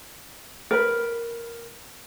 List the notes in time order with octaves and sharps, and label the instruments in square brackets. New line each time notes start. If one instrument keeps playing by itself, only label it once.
[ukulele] A#4 B4